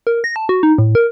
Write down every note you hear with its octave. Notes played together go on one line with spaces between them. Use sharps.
A#4
A#6
A5
F#4
D#4
A2
A#4